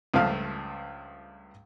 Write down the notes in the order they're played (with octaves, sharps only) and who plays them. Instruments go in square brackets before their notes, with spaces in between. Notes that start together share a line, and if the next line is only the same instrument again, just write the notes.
[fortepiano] C#2 G2 F3 A3 F5 F6